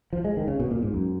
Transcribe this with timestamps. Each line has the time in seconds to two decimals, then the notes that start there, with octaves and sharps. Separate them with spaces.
0.13 F3
0.24 G#3
0.37 D#3
0.48 C#3
0.60 B2
0.71 A#2
0.82 G#2
0.94 F#2